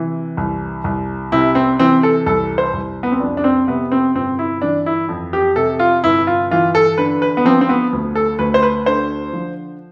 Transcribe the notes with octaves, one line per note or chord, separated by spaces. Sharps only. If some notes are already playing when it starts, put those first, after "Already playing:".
Already playing: C3 E3
C2
C2
C3 E4
C4
E3 C4
A4
C2 A4
C5
C2
B3
C4
F2 D4
D4
C4
C3 B3
C4
G1 C4
E4
E3 D4
E4
F2
G4
C3 A4
F4
G1 E4
F4
E3 F4
A4
D3 B4
B4
B3
F3 C4
C4
B3
D2
A4
D2 B4
C5
B4
D3 C5
F3